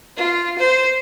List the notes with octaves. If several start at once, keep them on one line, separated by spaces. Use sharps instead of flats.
F4
C5